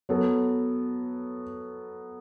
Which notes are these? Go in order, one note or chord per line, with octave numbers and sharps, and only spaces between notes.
F#3 B3 A4